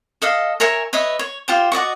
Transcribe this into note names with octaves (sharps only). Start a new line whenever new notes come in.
A4 D#5 F5
A#4 C#5 E5 G#5
B4 C#5 D#5 E5
C#5
F4 G4 C5
F#4 D5 D#5 C#6